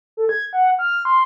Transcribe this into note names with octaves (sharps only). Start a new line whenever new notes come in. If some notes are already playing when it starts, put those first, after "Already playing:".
A4
G#6
F#5
F6
C6